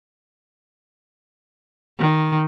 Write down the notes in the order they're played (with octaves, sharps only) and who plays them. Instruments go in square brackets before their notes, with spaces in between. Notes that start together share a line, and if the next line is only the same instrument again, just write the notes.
[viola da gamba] D#3